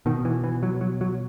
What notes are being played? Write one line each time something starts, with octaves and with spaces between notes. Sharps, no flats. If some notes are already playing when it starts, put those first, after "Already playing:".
B2 D#3
E3
E3
F#3
F#3
F#3